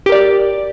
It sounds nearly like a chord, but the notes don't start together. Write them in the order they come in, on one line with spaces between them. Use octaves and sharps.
G4 A#4 D5